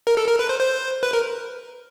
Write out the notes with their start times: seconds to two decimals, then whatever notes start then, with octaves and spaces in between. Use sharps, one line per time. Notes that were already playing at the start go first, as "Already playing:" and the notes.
0.07 A#4
0.17 A4
0.28 A#4
0.39 B4
0.49 C5
0.60 C5
1.03 B4
1.13 A#4